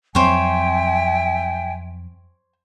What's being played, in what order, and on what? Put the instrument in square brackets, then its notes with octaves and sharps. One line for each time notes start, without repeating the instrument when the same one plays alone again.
[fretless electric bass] F2 F#3 C4 [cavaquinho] C5 C#5 [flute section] E5 G5 G#5